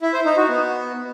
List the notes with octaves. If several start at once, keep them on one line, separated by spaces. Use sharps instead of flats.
E4
C5
D#4
F#4
B3